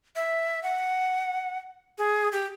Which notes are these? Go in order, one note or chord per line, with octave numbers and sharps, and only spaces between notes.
E5
F#5
G#4
G4